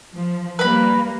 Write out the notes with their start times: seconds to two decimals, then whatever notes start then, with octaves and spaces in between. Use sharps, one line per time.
0.14 F3
0.59 G3 A#3 B4 B5